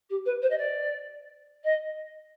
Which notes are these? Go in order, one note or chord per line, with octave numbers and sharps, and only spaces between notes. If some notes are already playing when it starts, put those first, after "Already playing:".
G4
B4
C5
D#5
D5
D#5